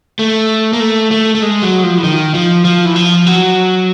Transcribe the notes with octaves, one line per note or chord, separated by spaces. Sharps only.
A3
A#3
A3
A3
A3
G#3
F#3
F3
E3
D#3
F3
F3
E3
F3
F#3